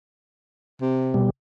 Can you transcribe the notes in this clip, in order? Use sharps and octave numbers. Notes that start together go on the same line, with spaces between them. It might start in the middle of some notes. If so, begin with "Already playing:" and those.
C3
B2 G3